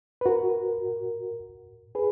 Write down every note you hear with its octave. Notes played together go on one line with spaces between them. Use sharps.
B4
F#4 A#4
G#4 B4